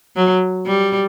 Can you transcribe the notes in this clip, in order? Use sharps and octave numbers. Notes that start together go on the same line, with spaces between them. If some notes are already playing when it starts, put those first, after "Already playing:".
F#3
G3